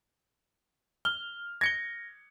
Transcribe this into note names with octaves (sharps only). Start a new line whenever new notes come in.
F6 G7
G#6 A#6 C#7 G7